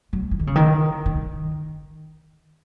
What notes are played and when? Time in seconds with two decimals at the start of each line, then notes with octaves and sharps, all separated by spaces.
0.13 F#3
0.31 E3
0.39 D#3
0.47 C#3
0.55 D#3
1.06 D#3